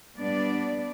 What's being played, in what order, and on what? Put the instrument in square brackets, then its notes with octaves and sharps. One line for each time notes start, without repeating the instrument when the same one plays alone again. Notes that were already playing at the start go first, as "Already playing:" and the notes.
[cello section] G3 B3 D4 D5